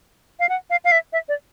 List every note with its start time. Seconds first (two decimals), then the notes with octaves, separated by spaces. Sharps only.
0.40 F5
0.49 F#5
0.70 F5
0.85 F5
0.92 E5
1.13 E5
1.29 D5